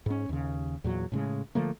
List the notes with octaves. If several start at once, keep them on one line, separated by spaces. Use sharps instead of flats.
G#2 C#4
D#2 C#3
E2 A#2 F#3
A2 C#3 G#3
D3 F3 A3 A#3